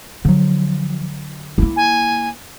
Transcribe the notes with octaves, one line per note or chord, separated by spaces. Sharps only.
D3 F3 F#3
A#3 E4
G#5